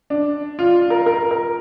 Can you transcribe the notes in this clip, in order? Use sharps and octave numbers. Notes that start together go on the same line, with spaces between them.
D4
F4
A#4
A#4
A#4